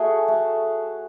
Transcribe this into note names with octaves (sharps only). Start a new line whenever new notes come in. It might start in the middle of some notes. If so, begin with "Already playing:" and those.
Already playing: A3 F#4 G#4
A3